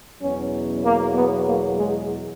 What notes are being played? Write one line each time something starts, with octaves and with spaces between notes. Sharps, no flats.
E2 B2 F#3 C#4
A#3
B3
A#3
G#3